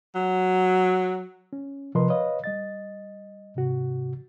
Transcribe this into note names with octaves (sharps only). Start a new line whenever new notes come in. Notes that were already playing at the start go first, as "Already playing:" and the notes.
F#3
C#4
C3 F3 A#4 B4 D#5 C6
B4 C#5 D#5 F5
G3 D#5 A6
G#2 C3 F#4